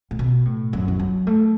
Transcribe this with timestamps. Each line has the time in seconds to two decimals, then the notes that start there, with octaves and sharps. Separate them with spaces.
0.11 A2
0.19 B2
0.45 A2
0.73 F#2
0.88 E3
1.00 F#3
1.27 A3